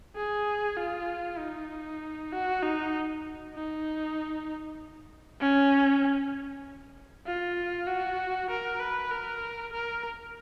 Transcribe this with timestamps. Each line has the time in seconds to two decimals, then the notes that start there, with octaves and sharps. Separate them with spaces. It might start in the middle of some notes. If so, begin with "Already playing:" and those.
0.16 G#4
0.77 F4
1.39 D#4
2.32 F#4
2.62 D#4
3.55 D#4
5.40 C#4
7.27 F4
7.87 F#4
8.50 A#4
8.80 B4
9.11 A#4
9.73 A#4